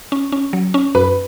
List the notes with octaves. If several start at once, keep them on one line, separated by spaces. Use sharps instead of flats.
C#4
C#4
F#3
C#4
F#2 B4